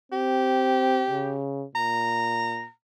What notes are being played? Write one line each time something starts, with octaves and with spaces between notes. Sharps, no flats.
C4 G4
C#3
A#2 A#5